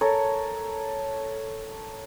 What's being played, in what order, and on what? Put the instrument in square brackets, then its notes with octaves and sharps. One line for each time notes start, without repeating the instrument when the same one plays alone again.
[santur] A4 A#4 C#5